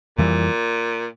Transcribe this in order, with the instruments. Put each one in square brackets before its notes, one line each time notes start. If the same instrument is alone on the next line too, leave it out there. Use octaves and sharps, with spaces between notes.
[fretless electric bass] F2 E3 G3 [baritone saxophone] A#2